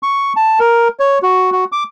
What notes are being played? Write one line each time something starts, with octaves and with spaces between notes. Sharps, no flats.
C#6
A5
A#4
C#5
F#4
F#4
D6